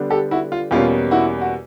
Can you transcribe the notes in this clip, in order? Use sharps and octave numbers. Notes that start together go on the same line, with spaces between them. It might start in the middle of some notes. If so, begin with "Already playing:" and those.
Already playing: D3 G3 B3 D4
G4 A4
E4 F#4
F4
E2 B2 G3 A#3 C#4 F4
E4 F#4
F#4